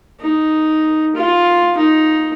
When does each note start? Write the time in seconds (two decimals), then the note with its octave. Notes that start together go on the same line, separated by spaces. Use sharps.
0.20 D#4
1.15 F4
1.77 D#4